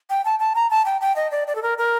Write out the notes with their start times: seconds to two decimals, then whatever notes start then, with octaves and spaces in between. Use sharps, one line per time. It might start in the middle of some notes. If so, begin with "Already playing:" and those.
0.10 G5
0.25 A5
0.40 A5
0.55 A#5
0.71 A5
0.86 G5
1.01 G5
1.16 D#5
1.31 D5
1.47 D5
1.55 A4
1.63 A#4
1.78 A#4